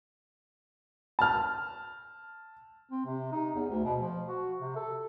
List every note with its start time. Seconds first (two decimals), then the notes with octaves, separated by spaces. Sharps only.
1.19 A5 F6
2.91 C4
3.05 C3
3.32 D#4
3.55 E2
3.70 D2
3.84 B2
4.00 F3
4.28 F#4
4.60 C3
4.76 A4